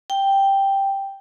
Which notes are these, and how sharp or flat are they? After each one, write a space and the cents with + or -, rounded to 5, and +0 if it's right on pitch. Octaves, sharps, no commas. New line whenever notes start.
G5 +0